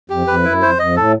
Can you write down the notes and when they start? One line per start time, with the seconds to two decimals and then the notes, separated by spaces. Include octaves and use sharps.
0.10 F2 G4
0.27 F2 B4
0.44 F#2 E4
0.62 F2 C5
0.78 F2 D#5
0.96 A2 A4